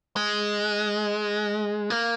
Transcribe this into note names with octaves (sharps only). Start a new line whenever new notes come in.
G#3
A#3